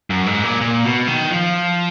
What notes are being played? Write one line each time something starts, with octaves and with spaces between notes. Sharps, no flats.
F#2
G#2
A#2
A#2
B2
D#3
F3